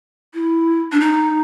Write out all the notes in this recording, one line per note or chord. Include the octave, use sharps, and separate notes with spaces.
E4
D4
D#4